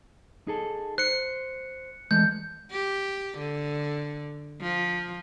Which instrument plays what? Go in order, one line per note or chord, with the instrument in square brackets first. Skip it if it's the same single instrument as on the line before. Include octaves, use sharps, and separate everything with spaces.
[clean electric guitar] D#4 G#4 A4
[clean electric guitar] C5 [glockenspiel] F#6 C#7
[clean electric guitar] E3 G#3 A3 [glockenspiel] G6
[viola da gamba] G4
D3
F3